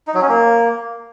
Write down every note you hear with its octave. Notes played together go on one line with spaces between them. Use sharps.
D#4
F#3
C#4
A#3